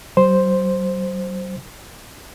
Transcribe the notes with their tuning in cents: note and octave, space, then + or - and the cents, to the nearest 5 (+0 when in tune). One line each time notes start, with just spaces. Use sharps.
F#3 +40 C5 +0